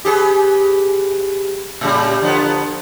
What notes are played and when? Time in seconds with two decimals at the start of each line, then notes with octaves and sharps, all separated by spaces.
0.05 G4 G#4 B4
1.81 A2 C#3 G3
2.22 D3 F3 B3